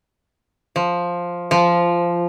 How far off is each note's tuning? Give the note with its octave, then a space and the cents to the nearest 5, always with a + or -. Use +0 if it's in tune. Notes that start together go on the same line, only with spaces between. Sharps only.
F3 +5
F3 -10